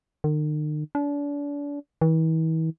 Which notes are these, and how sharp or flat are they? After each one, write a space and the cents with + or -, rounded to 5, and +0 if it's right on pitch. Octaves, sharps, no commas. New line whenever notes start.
D#3 -45
D4 -35
E3 -40